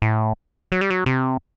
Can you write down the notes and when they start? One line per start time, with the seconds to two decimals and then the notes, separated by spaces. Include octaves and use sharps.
0.02 A2
0.72 F#3
0.81 G3
0.90 F#3
1.06 C3